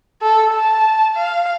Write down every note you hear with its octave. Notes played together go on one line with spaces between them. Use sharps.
A4
A5
F5